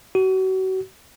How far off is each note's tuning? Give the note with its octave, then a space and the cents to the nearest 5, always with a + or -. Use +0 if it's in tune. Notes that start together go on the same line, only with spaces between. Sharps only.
F#4 +35